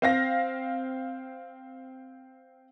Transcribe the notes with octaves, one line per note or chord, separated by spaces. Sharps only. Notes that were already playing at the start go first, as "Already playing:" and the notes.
C4 F5 A#6